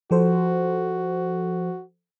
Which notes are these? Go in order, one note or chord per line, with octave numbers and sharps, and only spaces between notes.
F3 F#4 A4 C5